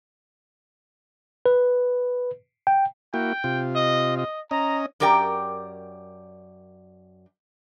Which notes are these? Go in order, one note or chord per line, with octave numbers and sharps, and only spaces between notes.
B4
G5
A#3 E4 F#4 G5
C3 F4
D#5
D#5
C#4 D#5 A#5
F#2 G4 A#4 D5 G5